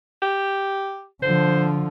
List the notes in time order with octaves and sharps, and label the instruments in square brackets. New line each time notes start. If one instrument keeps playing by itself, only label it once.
[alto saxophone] G4
[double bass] D3 F3 [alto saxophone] C5